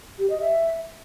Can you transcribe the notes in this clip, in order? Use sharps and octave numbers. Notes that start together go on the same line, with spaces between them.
G4
D#5
E5